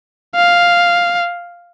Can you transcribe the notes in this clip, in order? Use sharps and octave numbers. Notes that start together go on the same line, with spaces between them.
F5